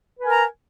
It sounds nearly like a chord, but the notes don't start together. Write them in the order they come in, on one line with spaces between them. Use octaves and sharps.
B4 G#5 A#4 A#5